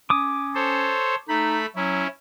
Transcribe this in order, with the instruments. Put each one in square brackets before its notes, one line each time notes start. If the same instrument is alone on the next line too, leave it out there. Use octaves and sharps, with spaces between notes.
[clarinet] C#4 [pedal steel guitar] D6 D#6
[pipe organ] A4 C5 C#5
[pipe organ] A3 B5 [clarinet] D#4
[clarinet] F#3 [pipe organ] C#4 E4